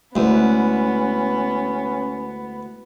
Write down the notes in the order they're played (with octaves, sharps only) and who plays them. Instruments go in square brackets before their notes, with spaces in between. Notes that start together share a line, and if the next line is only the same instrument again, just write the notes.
[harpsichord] D2 [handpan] G#3 E4 B4 [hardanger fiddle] B3 [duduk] C#4